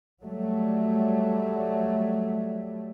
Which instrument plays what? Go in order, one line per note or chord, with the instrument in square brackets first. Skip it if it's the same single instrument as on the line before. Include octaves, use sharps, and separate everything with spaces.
[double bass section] F#3 G3 A3